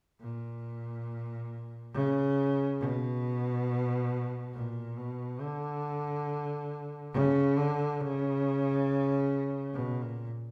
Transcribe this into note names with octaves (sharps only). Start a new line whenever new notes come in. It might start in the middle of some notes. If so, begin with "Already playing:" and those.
A#2
C#3
B2
A#2
B2
D3
C#3
D3
C#3
B2
A#2